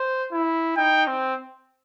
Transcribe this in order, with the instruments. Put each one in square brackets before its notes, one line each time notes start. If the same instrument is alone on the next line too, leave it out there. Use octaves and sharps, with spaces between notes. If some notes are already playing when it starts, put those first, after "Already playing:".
Already playing: [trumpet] C5
E4
[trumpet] D#4 [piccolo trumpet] G5
[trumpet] C4